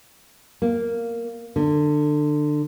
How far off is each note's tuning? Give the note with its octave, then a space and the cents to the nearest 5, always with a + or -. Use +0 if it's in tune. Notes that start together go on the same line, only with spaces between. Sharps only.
A#3 -5
D3 +25